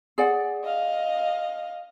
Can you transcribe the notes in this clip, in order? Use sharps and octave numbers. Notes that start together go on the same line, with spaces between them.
G#4 D5 F#5
D#5 F5